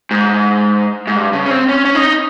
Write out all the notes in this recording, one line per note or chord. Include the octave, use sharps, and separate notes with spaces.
G#2
G#2
G2
C#3
C#4
C4
C#4
C#4
D#4